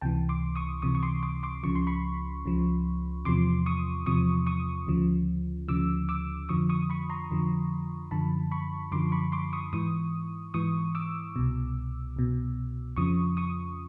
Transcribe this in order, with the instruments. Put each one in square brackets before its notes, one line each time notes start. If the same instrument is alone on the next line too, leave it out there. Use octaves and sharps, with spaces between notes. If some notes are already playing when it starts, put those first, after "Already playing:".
[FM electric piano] C#2 C3 E3 G5 A5
C6 D6
C#6 D#6
C#2 C3 E3 C#6 D#6
C#6
C6 D6
C6 D6
C6 D6
C#2 C#3 F3 C#6
C6
B5 C#6
C#2 C#3 F3
E2 C3 F3 C6 D6
C#6 D#6
E2 C3 F3 C#6 D#6
C#6 D#6
D2 C#3 F3
D2 C#3 F3 D6 E6
D6 E6
F2 D3 F3 C#6 D#6
C#6 D#6
B5 C#6
A#5 C6
F2 D3 F3
F#2 D3 F3 A5 B5
B5 C#6
F#2 D3 F3 C6 D6
B5 C#6
C6 D6
C#6 D#6
G#2 E3 C#6 D#6
G#2 E3 C#6 D#6
D6 E6
C2 B2
C2 B2
F2 C#3 F3 C#6 D#6
C#6 D#6